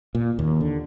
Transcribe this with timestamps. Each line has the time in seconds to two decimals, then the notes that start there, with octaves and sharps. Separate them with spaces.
0.15 A#2
0.39 D#2
0.61 D3